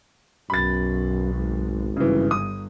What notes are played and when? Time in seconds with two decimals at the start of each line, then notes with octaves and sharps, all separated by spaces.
0.50 B1 F#2 B5 A6
1.34 G#1
1.97 G1 C#3 E3
2.31 D#6